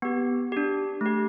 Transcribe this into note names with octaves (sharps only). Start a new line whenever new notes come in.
B3 G4
D4 G4
A3 G4